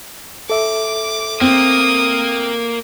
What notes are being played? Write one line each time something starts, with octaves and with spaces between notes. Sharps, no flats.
A4 E5 D6
A#3 C4 D#6